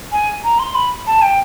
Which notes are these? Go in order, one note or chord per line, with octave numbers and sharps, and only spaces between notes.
G#5
A#5
C6
B5
A5
G5